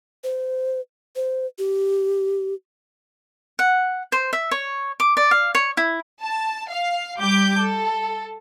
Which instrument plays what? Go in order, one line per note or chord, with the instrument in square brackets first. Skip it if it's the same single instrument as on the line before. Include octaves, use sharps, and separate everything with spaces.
[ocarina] C5
C5
G4
[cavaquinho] F#5
C5
E5
C#5
D6
D5
F5
C#5
E4
[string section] A5
F5
G3 G4 D6 G6
A4